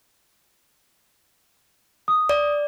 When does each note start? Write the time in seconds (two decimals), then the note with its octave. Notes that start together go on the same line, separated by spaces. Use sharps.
2.08 D#6
2.29 D5